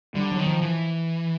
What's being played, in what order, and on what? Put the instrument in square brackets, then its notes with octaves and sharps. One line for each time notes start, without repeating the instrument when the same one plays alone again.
[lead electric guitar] D3 [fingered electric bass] G3
[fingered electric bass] F#3
[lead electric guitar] D#3
[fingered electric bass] F3
[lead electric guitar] E3